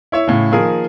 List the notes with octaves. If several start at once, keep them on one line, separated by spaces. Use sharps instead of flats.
E4 C#5 E5
A2 C#3
D#3 F3 A#3 G#4 A#4